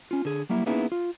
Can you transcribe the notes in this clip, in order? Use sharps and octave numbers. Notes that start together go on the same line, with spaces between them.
C#4 F4
D3 G#4
F#3 G3 A#3 E4
A#3 B3 C#4 D#4 E4 G#4
F4